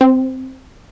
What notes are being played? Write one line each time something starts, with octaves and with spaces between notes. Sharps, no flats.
C4